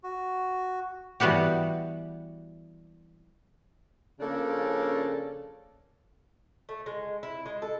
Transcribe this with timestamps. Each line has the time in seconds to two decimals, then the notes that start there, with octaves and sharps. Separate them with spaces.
0.04 F#4
1.20 E3 G3 B3 F#4 G4
4.20 C#3 F3 A#3 C#4 D4 A4
6.69 A3
6.86 G#3
7.23 E4
7.46 G#3
7.62 A4